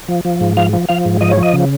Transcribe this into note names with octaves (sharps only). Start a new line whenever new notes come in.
F3
F3
G#2
F3 F5
F3
F3 F5
G#2
F3 D#5
C#5
F3
D#5
C#3